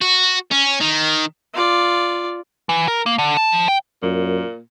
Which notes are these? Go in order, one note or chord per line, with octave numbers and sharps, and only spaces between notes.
F#4
C#4
D#3
F4 D5
E3
A#4
A#3
D3
A5
F3
G5
F#2 A#2